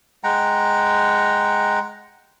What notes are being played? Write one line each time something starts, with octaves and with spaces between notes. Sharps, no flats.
G#3 F#5 G5 A#5